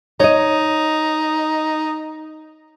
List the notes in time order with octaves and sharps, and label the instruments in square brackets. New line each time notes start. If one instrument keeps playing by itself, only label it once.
[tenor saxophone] D#4 [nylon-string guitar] C#5 D#5